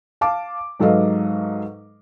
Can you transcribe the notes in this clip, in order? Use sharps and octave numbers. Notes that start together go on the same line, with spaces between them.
F5 A5 D6
G#2 F#3 A4 B4 D#5 F5